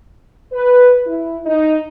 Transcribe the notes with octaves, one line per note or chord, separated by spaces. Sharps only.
B4
E4
D#4